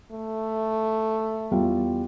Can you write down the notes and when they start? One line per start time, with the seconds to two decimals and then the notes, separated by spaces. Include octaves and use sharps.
0.12 A3
1.51 E2 G3 F4